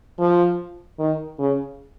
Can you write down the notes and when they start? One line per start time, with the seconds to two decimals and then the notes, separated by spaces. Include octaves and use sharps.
0.19 F3
0.99 D#3
1.39 C#3